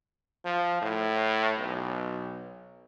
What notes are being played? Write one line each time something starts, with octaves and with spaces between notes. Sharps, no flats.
F3
A2
B1